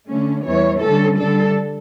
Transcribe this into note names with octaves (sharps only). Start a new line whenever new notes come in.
D3 A3 C#4
E2 E3 G3 C#5
D3 G3 C#4 A4
D3 G3 D4 A4